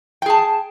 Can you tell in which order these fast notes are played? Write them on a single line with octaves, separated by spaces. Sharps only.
G5 G#4 A5